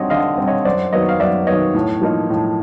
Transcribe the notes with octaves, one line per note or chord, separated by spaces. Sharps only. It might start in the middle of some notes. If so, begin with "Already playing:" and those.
Already playing: D3 G3 C4 C#5 D#5
D3 D#5 F5
G3 C4
C#5 D#5
F#2 C5 D5
D#3 F#3 B3 C#5 D#5
F5
F#2 D5 E5
D#3 F#3 B3 C#5 D#5
A2
F3 A#3 D#4
A2